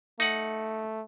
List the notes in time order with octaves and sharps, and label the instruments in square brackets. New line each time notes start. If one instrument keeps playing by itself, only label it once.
[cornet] A3 [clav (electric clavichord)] D#4 F#5